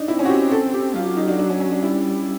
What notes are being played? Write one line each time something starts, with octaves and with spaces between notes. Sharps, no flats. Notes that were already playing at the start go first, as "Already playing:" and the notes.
Already playing: D4 D#4
C4 E4
C#4
F#4
G4
A4
G4
F#3 F4
D#4
D4
D4
C#4
C#4
D4
G3 E4